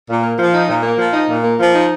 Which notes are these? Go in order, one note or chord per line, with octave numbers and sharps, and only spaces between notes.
A#2
A#3
F3
D#4
A#2
A#3
F3
D#4
A#2
A#3
F3
D#4